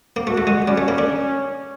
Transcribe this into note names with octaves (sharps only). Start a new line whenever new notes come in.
A#3
A3 F#4
A3
G#3
G3 C#4
A3
A#3
D4